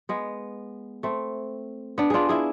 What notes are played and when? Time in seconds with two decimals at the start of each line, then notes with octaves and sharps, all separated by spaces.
0.09 G#3 B3
1.03 A3 C4
1.98 B3 D4
2.10 D4 F4 G#4
2.29 E4 G#4